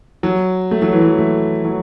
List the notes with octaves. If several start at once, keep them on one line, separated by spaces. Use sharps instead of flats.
F#3
A3
F#3
E3
F#3
A3
F#3